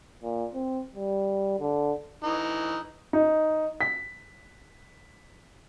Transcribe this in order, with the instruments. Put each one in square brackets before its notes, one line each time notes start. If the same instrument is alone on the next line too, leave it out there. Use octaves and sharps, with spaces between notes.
[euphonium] A#2
C4
G3
D3
[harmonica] E3 D#4
[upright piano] D#4
B6